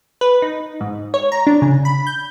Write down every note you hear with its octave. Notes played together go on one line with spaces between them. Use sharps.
B4
D#4
G#2
C#5
A#5
D4
C#3
B5
G6